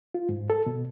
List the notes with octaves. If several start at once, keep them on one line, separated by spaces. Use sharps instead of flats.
F4
G#2
A4
B2